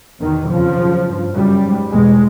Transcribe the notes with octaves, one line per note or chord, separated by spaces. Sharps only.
E2 B2 D#3
F2 C#3 F3
F#2 C#3
G2
F#2 C#3 G3
G#2
E2 B2 G#3